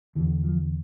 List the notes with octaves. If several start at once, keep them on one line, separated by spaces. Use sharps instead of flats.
E2 D3 E3
F3